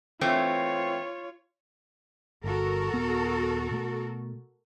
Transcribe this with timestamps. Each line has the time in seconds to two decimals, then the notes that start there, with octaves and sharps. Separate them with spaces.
0.21 E3 A3 C4 F4 C#5
2.44 G1 F#4 A4 A#4
2.94 D#1 B3
3.71 B2 A3